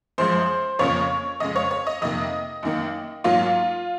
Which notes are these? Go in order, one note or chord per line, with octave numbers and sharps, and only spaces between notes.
F#2 F3 G#3 C5
F2 C#3 F3 A#3 C#5
F2 C#3 G#3 D#5
C#5
C#5
D#5
F2 C3 D#3 A#3 D#5
F#2 D#3 A#3
G#2 F#3 A#3 F4